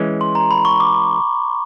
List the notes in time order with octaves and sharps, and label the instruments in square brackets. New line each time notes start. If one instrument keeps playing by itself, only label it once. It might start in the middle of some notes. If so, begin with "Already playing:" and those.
Already playing: [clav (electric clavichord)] E3 G#3 C#4
[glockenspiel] C6
A#5
B5
C#6
D6